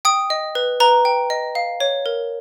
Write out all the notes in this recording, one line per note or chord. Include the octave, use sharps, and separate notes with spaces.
G5 D#6
D#5
B4
B4 A#5
G5
D#5
F5
C#5
A#4